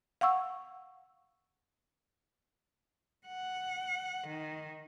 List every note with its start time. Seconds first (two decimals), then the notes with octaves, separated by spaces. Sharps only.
0.21 F5 F#5 C#6 E6
3.27 F#5
4.27 D#3